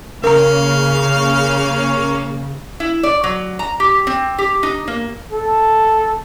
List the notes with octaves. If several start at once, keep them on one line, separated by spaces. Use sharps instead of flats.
C#3 A#3 C#4 A#4 F5 A#5
E4
D5
F#3
A#5
G4
C4
G4
D#4
A#3
A4